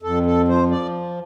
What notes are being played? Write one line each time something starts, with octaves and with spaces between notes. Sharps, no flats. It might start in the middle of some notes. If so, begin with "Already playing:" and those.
F2 A4
A4
F3 C5
D5